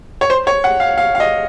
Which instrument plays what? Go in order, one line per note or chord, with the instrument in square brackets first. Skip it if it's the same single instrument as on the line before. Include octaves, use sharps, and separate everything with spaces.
[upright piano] C#5
C5
C#5
F#5
F5
F5
F5
D#5